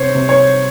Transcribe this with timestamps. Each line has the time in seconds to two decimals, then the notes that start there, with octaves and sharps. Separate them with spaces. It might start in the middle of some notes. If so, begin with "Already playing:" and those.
Already playing: C3 C5 C#5
0.15 C3
0.29 C#5